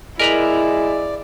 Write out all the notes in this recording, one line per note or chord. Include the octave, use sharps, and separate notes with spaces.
G#3 E4 A#4 B4 D5 A#5